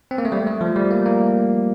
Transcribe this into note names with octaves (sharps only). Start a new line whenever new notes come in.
C4
A#3
A3
G3
A3
F3
G3
A#3
A#3